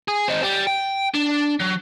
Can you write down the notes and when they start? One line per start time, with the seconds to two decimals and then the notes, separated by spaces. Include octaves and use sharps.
0.08 G#4
0.28 C4 D#4
0.43 G3
0.67 G5
1.14 D4
1.60 F#3